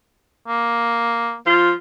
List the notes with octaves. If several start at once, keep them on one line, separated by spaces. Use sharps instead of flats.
A#3
F3 F4